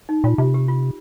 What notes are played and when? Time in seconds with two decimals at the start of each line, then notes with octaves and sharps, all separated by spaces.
0.09 D#4
0.24 A#2 F4
0.38 C3 F4
0.54 G4
0.68 F4